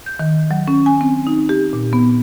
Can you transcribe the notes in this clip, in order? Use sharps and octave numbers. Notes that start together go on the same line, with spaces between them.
G6
D#3
F#3
C#4
G#5
C4
D#4
G4
A#2
B3